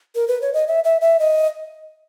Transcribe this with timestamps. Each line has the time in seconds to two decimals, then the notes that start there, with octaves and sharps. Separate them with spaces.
0.15 A#4
0.28 B4
0.41 C#5
0.54 D#5
0.67 E5
0.84 E5
1.01 E5
1.19 D#5